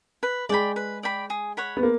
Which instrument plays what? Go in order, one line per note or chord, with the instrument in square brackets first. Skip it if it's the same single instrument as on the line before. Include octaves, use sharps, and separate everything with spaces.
[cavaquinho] B4
[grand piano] G#3 [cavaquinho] D5 G5 B5
[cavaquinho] B4
D5 G5 B5
G#4
C#5 F#5 B5
[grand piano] B3
A#3